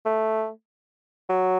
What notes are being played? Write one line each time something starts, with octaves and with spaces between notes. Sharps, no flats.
A3
F#3